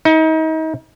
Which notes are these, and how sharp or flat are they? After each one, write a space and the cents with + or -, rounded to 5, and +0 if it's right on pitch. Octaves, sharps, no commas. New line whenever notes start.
D#4 +35